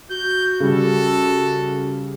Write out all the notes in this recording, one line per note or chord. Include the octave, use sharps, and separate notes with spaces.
F#4 G6
C#3 G3 A4